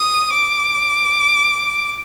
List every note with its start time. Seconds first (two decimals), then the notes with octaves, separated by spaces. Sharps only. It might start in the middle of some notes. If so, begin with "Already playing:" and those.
Already playing: D#6
0.33 D6